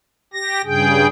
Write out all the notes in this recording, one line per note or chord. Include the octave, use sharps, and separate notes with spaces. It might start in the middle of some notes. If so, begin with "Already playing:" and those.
G4 A#6
G2 C#3 G#4 G5